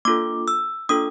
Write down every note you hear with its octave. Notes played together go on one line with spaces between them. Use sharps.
A#3 D4 F4 A4 D6
E6
A#3 D4 F4 A4 D#6